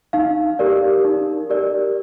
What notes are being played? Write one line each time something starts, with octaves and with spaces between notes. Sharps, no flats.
D#4 F5
G4 A#4 D5
D#4
G4 A#4 D5